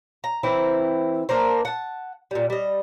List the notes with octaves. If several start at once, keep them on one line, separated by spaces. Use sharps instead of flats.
A#5
E3 C4 E4 A#4
A#3 D4 A#4 C5
F#5 A5
A#2 G3
G3 D#5